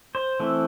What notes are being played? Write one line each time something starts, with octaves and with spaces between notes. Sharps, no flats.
C5
E3 A3 C4